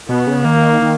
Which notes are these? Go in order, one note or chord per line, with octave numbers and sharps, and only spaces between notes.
B2 B3
C#3
D#3 A#3
D#3